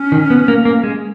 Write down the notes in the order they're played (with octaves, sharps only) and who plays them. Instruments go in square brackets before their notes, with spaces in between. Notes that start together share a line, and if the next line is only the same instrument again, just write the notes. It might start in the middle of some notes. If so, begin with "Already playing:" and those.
Already playing: [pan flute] C#4
[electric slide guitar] D#3
B3
A#3
A#3
G#3